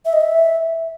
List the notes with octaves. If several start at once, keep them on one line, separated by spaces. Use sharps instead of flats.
E5
D#5
E5